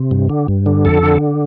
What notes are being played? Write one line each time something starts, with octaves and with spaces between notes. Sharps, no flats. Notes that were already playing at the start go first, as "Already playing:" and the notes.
Already playing: C3
G2
D3
G2
D3
F2 A4
D3